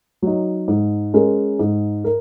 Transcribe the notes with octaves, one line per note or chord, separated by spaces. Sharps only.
F#3 D#4
G#2
G#3 C#4 A#4
G#2
A#4